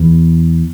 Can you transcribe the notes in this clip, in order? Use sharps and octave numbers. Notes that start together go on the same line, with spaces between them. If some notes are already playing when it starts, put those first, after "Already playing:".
Already playing: E2